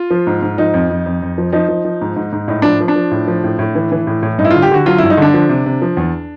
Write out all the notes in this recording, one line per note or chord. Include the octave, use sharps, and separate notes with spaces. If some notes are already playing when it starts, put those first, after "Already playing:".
Already playing: F4
F3
G#2
G#2
F3 D#4
F2
F2
F2
F2
F3
F3 D#4
F3
F3
G#2
G#2
G#2
A2 D#4
F3 D4
F3
D4
F3
A2
F3
A2
A2
E3
E3
A2
A2
G2 D#4
E4
D3 F4
G4
D3 F#4
F#3 F4
G2 E4
D#4
D3 D4
F3
C3
C3
F3
E2